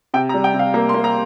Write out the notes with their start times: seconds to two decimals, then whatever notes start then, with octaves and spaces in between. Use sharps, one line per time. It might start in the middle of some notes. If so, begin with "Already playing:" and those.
0.14 C3 G5
0.29 A#5
0.34 G3
0.44 G5
0.54 C3
0.59 F5
0.74 A#3 A#5
0.89 C6
0.94 A#3
1.04 A#5